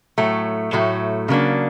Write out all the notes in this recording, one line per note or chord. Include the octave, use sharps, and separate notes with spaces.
A2 F#3 A3
A2 F#3 A3
C#3 F#3 A#3 D4